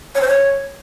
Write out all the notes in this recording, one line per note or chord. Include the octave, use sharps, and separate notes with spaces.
C#5
C5
C#5